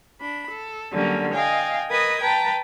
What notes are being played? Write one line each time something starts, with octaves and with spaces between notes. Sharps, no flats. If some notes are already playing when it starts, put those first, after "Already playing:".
D4 B5
A4
D3 F#3 G3 A#3 C#4
D#5 F5 G5 G#5
A#4 B4 D#5 D#6 G#6
B4 G5 A5 A#5